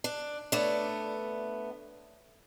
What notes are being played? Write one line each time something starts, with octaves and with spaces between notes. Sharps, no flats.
D4
A3 B3 D4 C#5 D5